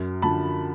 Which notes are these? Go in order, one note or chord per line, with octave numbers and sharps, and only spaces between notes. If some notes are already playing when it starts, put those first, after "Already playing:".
Already playing: F#2
D3 F3 A5 B5